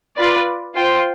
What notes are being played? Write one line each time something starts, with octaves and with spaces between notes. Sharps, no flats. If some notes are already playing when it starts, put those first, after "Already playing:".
F4 B4 D5
F4 C5 G5